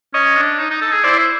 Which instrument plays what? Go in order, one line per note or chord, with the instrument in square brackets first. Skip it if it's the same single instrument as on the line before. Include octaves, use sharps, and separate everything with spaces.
[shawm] C#4 [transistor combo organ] C#5 D#5
[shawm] D4
D#4
D#4
A4
G#4
[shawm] E4 [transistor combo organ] C5 D5